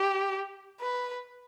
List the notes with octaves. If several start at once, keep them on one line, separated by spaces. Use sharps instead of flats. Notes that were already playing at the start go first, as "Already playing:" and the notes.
Already playing: G4
B4